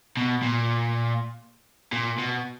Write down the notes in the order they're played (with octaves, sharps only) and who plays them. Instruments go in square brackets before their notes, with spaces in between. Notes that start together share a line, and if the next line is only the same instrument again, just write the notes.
[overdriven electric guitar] B2
A#2
A#2
B2